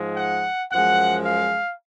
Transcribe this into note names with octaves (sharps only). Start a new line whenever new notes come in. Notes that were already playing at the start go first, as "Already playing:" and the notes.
Already playing: G#2 F3 G#3
F#5
F#2 F3 G#3 F#5
F5